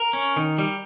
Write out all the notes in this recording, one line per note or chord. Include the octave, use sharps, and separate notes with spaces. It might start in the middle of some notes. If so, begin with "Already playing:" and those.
Already playing: A#4
C#4
D#3
G3